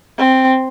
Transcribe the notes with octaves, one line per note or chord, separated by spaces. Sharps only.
C4